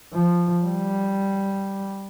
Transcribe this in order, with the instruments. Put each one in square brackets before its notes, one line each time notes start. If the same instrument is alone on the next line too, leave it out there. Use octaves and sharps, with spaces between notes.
[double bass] F3
G3